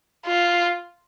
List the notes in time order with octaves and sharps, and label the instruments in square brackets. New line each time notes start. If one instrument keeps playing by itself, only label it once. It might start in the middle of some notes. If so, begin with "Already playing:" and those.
[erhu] F4